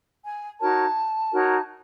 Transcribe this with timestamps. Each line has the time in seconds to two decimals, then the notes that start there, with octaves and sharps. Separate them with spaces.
0.24 G#5
0.60 D#4 F#4 A#4 C#5 A5
1.31 D#4 F#4 A#4 C#5